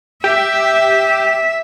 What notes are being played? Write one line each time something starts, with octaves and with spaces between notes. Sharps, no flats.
G4 E5